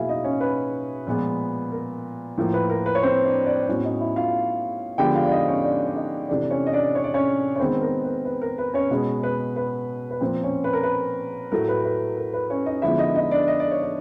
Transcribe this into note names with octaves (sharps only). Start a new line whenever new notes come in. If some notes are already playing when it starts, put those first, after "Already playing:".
Already playing: B2 F#3 A#3 E4 G#4 E5 F5 G#5
D#4 D#5
C#4 C#5
B4
A#2 F3 G#3 B3
A#4
A2 F3 A#3
B4
A#4
B4
C#5
C4 C5
D4 D5
D4 D5
A2 F#3 B3 C#4 C#5
D#4 D#5
E4 E5
F4 F5
D3 F3 G#3 B3 G4 G5
F4 F5
D5
D#4 D#5
C#4 C#5
D4 D5
D5
D#4 D#5
C3 E3 A3 D4 D5
C#4 C#5
D#5
D4 D5
C#5
D5
C#4 C#5
C#5
D#3 G#3 B3 C4 C5
B4
A#4
B4
B4
A#4
B4
C#4 C#5
B2 G#3 B3
B4
B4
B4
A#2 F3 A#3 C4 C5
C#4 C#5
B4
A#4
B4
A2 F#3 A3 A#4
B4
B4
A#4
B4
C#4 C#5
D#4 D#5
D3 F3 G#3 B3 E4 E5
D#4 D#5
D#4 D#5
D4 D5
D#5
D5
C#5
D4 D5